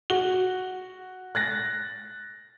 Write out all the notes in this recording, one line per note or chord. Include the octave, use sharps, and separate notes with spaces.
F#4 G7
F#6 A6 A#6